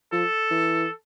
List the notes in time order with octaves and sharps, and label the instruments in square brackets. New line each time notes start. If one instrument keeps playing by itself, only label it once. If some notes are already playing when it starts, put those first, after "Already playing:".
[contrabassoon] F3 [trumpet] A4
[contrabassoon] E3